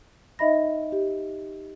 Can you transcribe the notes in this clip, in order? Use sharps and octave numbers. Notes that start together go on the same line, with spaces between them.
D#4 D#5 E5 B5 A#6
G4